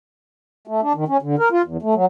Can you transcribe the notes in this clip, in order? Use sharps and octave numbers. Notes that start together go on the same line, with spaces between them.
A3
D4
D#3
C#4
D3
A#4
F4
E2
A3
F#3